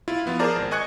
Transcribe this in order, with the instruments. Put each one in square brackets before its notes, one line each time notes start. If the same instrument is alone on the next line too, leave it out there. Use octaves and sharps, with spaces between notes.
[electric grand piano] E4 F4
F3 B3 E4 F4
G#4 A#4 C5 D5 A5 A#5
G#1
D#5 G#5 C#6 F#6 G#6 C#7